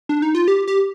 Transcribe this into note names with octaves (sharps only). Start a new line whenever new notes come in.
D4
D#4
F4
G4
G4